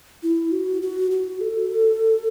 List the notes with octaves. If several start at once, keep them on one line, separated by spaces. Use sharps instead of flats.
E4
F#4
F#4
F#4
A4